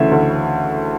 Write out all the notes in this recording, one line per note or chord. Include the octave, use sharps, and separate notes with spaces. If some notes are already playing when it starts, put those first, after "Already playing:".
Already playing: D2 C#3 E3 A3 E5
D2